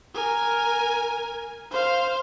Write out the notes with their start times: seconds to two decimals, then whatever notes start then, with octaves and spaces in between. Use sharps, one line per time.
0.14 A#4 G#5
1.71 C5 F5